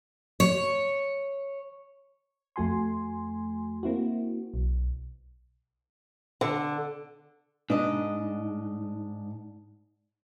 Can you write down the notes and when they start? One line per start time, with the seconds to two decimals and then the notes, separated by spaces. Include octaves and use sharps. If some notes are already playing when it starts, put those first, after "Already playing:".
0.40 C#5
2.56 F2 A3 F#4 G#5 C6
3.83 A#3 C4 E4 F#4
4.54 B1
6.41 D3
7.70 G#2 D4 D#5